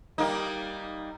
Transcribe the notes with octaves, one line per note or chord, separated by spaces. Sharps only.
G3 A#3 D#4